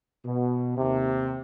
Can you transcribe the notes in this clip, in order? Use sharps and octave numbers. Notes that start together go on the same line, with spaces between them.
B2
D#2 C3